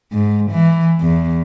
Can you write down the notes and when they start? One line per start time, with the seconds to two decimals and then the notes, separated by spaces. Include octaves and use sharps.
0.12 G#2
0.50 E3
1.00 E2